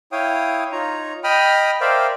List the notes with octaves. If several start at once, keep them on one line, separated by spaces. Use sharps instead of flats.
E4 C#5 F5 G5 D#6
D#4 F4 C#5 A#5
D#5 G5 B5 D#6 F6
A#4 C5 D5 E5 F5 G5